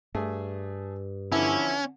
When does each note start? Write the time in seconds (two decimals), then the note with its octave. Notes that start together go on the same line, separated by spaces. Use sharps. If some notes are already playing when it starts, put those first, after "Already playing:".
0.15 G2 A3 G#4
1.32 D3 E3 F3 B3 C#4 E4